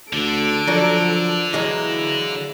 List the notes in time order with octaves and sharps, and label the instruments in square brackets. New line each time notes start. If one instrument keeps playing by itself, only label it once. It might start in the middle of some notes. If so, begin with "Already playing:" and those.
[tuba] D2 [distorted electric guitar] D3 [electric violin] A4 D7
[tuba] F3 [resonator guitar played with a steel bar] F#3 D4 A#4
[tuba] E3 [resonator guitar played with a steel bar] F#3 G#3 A#3 [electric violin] E4